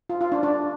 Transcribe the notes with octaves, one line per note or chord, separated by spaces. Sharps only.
F4
F4
D4
D4